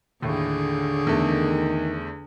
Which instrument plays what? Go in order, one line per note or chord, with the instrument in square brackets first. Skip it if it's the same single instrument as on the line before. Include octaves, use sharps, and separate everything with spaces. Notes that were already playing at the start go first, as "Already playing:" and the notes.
[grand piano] D#2 A2 [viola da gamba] D3 G#4
[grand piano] E2 A3 [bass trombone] D#3